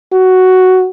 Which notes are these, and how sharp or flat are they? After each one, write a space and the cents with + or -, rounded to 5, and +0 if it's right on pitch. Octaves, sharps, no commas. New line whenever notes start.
F#4 +5